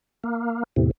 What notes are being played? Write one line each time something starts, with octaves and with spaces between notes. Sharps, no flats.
A#3
E2 A2 C3